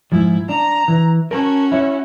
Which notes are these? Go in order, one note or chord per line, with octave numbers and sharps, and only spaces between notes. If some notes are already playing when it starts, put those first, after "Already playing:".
G#2 F3 E4
D4 A#5
E3
C#4 F#4 A#4 A5
E4 C#5